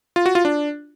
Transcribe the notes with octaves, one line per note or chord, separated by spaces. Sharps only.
F4
F#4
F4
D4